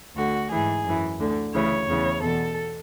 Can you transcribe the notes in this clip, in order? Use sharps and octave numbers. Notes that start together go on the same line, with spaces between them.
D2 D3 F#4
G#2 E3 G#4
F#2 E3
D2 D3
D2 C#3 E3 C#5
E2 C#3 E3
E2 B2 A4